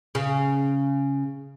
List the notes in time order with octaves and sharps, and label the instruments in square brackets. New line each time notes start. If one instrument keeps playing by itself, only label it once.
[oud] C#3